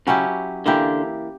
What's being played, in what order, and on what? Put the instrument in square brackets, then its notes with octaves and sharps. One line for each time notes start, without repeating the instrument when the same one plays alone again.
[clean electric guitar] C#3 [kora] F#3 C#4 E4 G4
[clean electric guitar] D3 [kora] E3 A#3 E4 G4